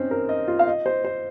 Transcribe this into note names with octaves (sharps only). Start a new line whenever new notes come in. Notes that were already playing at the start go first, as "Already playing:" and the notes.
Already playing: C4 C#4 D#4 C5
A#4
D#5
F4
F5
D#5
C5
C5